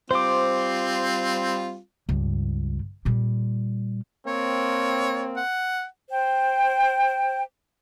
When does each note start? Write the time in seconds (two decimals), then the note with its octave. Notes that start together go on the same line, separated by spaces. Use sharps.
0.11 G3 C4 F4 C5 D6
2.09 C#2 G2
3.05 A#2 G3
4.27 A#3 C4 C#5
5.37 F#5
6.10 C5 G5